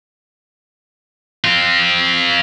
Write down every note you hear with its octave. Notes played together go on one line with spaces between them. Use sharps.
C4 F4